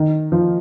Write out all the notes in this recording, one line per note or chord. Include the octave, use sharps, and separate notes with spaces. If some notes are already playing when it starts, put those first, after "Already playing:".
Already playing: D#3
F3